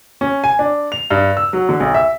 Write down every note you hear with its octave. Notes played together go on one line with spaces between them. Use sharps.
C#4
G#5
D4
F7
G2
E6
F#3
D3
B1
E5